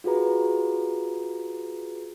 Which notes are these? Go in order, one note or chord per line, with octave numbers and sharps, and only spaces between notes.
F4 F#4 G#4 B4 A#5